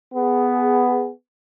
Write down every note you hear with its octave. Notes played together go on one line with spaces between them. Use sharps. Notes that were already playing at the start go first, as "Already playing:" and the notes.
B3 G#4